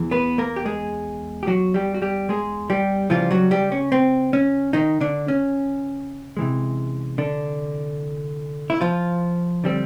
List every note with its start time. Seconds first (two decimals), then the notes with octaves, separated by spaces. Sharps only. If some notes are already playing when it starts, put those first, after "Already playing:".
Already playing: E2 E3
0.11 B3 B4
0.38 A#3 A#4
0.56 G4
0.65 G#3 G#4
1.43 G4
1.47 F#3 F#4
1.74 G3 G4
1.94 F#4
2.02 G3 G4
2.29 G#3 G#4
2.70 G3 G4
3.10 C#3 E3 F3 G3 A#3 F4
3.31 F#3 F#4
3.51 G3 G4
3.72 C#4
3.92 C4
4.33 C#4
4.73 D#3 D#4
5.01 D3 D4
5.28 C#4
6.37 C3 E3 G#3
7.18 D3 D4
8.70 E4
8.81 F3 F4
9.64 D3 G3 C4